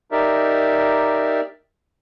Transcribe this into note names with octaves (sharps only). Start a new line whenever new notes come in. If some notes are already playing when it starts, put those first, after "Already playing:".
D#4 G4 A#4 D5 E5